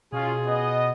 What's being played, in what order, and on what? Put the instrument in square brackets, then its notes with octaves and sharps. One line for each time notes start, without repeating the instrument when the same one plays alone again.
[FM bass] B2 [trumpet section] C#4 F4 [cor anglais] G#4
[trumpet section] B3 D#5